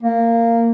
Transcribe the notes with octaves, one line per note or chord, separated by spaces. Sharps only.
A#3